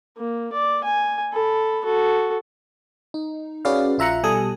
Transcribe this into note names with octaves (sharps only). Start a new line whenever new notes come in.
A#3
D5
G#5
A4 B5
F#4 A4
D#4
C#4 F#4 G#4 B4 D5 F5
A#1 F4 E5 A#5 F#6 C#7
B2 G3 A4 G#5 D#6